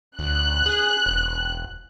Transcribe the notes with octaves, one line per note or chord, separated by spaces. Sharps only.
D2 F#6
G#4
E1